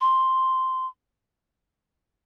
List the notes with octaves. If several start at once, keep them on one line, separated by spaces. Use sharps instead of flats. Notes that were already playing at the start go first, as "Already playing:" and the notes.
C6